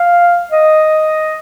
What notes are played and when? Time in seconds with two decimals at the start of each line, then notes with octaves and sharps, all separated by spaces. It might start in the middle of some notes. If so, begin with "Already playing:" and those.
Already playing: F5
0.51 D#5